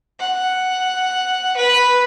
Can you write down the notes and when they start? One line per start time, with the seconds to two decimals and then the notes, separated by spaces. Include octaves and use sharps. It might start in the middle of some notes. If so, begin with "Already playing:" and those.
0.19 F#5
1.56 B4